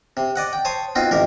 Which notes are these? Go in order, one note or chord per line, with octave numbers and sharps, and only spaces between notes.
C3
D5 D#5 F#5
G5
C5 C#5 A5 D#6
B3 C4 D#4 F4 F#4
A1 F2 G4 A#4